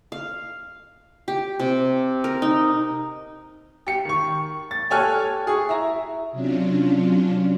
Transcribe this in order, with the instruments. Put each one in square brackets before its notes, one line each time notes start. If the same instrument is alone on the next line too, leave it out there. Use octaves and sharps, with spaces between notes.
[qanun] F5
G4
C3
A#4
D#4
[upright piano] G4 C#7
D#3 C#6
A6
G4 A4 C#5 G#5 F6 F#6
G#4 C#6
E4 A#5
[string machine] C3 F#3 C#4 D4 F4